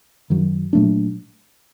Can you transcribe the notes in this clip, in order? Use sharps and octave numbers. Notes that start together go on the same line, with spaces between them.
F#2 D#3 F#3
A#2 F#3 A3 D4